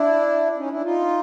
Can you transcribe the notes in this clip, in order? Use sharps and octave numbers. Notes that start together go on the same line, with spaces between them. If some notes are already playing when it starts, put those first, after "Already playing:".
Already playing: D4 E4
C#4 D#4
D4 E4
D#4 F4